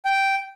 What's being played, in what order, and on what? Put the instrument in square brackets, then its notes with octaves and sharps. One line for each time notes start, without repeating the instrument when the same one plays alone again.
[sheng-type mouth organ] G5